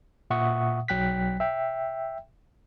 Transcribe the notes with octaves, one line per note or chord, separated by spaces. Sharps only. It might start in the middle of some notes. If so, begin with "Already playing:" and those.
A#2 E5 F#5 C#6 D#6
B1 F#3 G5 F#6 B6
E5 G5